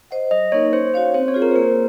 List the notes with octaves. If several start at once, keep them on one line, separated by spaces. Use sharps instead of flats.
C5 D#5 F#5
F#3 D#5
A#3 D#4 A#4 C#5
C#4 C5
F#4 C#5 F5
C4 C5
C#5
F4 G#4 C5
A#4
C5
A#3 A#4